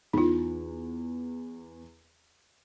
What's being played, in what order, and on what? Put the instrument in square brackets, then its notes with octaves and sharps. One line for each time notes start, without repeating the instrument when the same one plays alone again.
[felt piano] E2 [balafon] D#4 F4